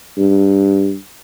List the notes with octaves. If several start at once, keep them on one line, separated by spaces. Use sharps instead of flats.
G2